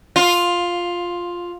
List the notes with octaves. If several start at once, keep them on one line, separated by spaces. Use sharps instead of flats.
F4